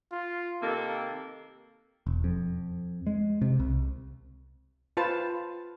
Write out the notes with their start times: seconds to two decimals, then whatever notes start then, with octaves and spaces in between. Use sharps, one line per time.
0.12 F4
0.62 C3 D#3 A#3 A4
2.07 E1
2.24 F2
3.07 G#3
3.42 C3
3.60 C2
4.97 F4 B4 C5 A5